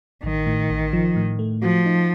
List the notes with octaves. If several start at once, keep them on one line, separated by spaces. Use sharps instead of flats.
A1 D#3
A2
A1
F3
A2
A3
F3 F#4
D#4